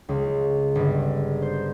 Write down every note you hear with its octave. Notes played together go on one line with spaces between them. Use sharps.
C#2
G1
C5